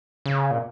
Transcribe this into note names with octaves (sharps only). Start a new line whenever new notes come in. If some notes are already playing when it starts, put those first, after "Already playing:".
C#3
A#2